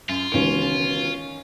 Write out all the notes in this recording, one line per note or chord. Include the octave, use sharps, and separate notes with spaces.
F#2 F4
E1 C#2 D#3 C#4 D7